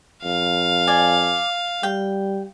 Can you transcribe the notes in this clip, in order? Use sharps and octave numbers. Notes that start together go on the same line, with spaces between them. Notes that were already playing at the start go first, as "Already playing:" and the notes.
F2 F5
D5 G#5
G3 G5